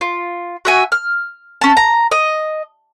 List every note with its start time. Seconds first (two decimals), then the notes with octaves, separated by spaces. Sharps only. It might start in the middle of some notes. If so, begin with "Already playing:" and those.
0.01 F4
0.65 F#4 E5 G#5
0.92 F6
1.61 C#4 A5
1.77 A#5
2.11 D#5